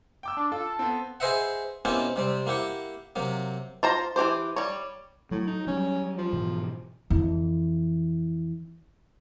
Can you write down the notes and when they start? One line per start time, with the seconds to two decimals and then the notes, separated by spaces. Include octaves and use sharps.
0.23 G5 D6 E6
0.37 D4
0.52 F4 A4
0.79 B3 C4
1.20 G#4 B4 C5 D#5 E5 F#5
1.85 B2 A#3 C4 C#4 E4 G4
2.16 C3 G3 C4
2.47 A#3 E4 G4 F#5
3.16 C3 F#3 A#3
3.83 F4 C5 A#5
4.16 E3 F#3 G4 C5
4.56 G3 C#5
5.31 A2 F#3
5.47 D#4
5.67 F#3 G3 C#4
6.18 F3
6.33 G#2 B2 E3
7.10 F2 E3